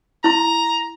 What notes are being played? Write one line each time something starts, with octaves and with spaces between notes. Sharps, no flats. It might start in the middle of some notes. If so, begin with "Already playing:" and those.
E4 A#5 C6